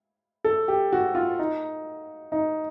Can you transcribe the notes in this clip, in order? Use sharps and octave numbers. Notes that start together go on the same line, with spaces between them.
A4
G4
F#4
F4
D#4
D#4